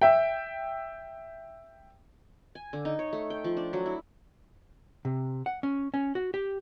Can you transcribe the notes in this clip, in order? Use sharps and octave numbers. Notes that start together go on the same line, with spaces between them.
E5 G5
G#5
D3
D#4
C#5
A3
G5
F3
D4
F#3
E4
C3
F#5
C#4
C#4
F#4
G4